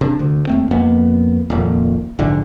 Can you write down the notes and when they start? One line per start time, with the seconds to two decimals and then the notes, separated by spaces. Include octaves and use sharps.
0.01 C3 D4
0.19 D2 D3
0.47 D#2 A3 C4
0.71 F2 A#3 B3
1.50 D#1 F2 A#2
2.19 A#1 G#2 D3 E3